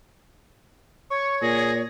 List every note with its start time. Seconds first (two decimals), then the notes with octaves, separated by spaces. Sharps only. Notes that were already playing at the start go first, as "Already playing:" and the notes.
1.10 C#5 C#6
1.42 A#2 G#4 A#6